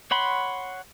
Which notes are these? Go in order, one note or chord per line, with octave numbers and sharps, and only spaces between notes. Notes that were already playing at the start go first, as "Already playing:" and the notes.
C#5 F#5 B5 C6